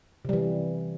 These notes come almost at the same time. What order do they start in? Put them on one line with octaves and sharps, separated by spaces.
C3 G3 E3